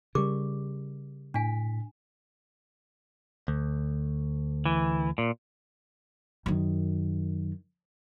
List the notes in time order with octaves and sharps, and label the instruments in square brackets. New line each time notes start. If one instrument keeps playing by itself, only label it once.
[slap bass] C#3 G3 [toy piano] G4 A#4 D6
[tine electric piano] A2 B6 [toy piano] D4 G#5
[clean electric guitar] D2
[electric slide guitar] E3
A#2
[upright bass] F#2 D#3